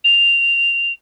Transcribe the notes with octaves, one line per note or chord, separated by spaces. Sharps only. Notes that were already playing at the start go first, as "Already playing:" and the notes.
F7